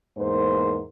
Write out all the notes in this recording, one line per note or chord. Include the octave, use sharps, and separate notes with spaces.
E2 G#2 A#3 A#4 C5